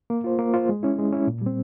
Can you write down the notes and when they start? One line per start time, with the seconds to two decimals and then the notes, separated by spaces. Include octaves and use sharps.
0.10 A#3
0.24 F4 C5
0.39 A#3
0.54 F4 C5
0.69 G#3
0.83 C#4 E4
0.99 G#3
1.12 C#4 E4
1.27 A#2
1.42 G3 C4